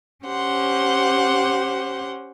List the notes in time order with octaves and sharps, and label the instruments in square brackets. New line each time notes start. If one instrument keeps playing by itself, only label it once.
[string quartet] C#4 G4 C5 F#5 C6